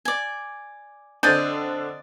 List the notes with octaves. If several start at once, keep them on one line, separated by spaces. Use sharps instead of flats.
D5 G#5
D3 C4 D4 D5 D#5 G6 A6